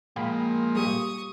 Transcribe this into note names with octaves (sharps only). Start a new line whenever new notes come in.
A#2 F3 G#3 A#3 F5 G5 B5
G3 G4 C#6 D#6